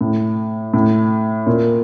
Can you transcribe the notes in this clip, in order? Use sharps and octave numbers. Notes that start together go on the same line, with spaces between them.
A2
A2
A#2